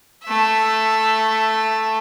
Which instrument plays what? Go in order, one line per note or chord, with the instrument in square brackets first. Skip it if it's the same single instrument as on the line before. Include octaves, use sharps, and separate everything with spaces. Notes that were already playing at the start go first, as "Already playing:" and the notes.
[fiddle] A3 E5